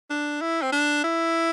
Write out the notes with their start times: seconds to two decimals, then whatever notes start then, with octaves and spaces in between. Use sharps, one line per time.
0.10 D4
0.41 E4
0.62 C4
0.72 D4
1.04 E4